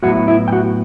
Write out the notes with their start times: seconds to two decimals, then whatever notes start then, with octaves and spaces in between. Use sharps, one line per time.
0.03 A2 F#3 B3 E4 F#4 F#5
0.28 E4 E5
0.48 G5
0.53 F#4 F#5